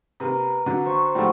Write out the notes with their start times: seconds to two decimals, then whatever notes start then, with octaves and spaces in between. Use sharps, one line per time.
0.20 C3 A#4 B4
0.66 D3 F#3
0.85 C5 B5 C#6
1.15 A2 F3 G3 A3 F#4